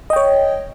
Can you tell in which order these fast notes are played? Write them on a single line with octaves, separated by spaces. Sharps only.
D#5 G5 C#5